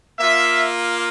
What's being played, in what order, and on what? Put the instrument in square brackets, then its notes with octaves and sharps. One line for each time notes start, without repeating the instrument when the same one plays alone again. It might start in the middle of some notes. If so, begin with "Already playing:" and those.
[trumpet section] A#3 F4 E5